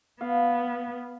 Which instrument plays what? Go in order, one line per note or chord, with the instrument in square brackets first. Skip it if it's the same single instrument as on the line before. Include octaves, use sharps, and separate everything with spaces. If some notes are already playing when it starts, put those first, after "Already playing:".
[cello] B3 [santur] F5